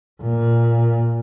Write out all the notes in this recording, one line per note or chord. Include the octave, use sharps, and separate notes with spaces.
A#2